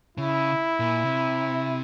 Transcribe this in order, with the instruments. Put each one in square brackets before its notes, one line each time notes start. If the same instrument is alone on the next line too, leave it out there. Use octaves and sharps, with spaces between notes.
[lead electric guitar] C#3 [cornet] E4
[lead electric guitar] A#2
C3